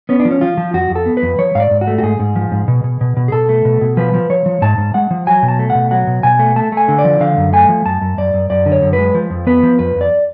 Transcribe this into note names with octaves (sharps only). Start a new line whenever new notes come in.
B3 C#4
D4
F3
C#4
F3 F4
F3
F2 F#4
F2
A4
B3
B4
F2
F3 C#5
G#2 F5
D5
G#2
F#4
A3
F#4
G#2 G#4
G#2
F3
G#2
B2
B2
B2
B2
G#4
B2 A4
A3
B2
B2
F3 B4
F3
F3 C#5
F3
G#2 A5
G#2
G#3 F#5
F3
F#3 G#5
B2
A5
A3
F#5
B2
F#3 F#5
B2
B2 G#5
A3
A3 A5
A3
G#5
D3
D5
F3
D3 F5
F#2
A3 G#5
F3
F#2 A5
F#2
F#2 D5
F#2
F#2 D5
D3
C#5
F#2
B4
G#3
F3
F2
B3 B4
F3
F2 B4
F2
D5